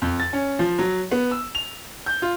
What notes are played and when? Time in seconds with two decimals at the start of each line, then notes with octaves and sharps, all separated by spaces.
0.02 F2
0.20 A6
0.33 C#4
0.59 F3
0.79 F#3
1.12 B3
1.31 E6
1.55 F7
2.06 G6
2.22 F4